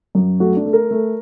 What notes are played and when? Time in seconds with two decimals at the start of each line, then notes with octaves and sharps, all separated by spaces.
0.15 F#2
0.40 A3 F#4
0.57 D4
0.65 A3
0.73 A#4
0.91 A3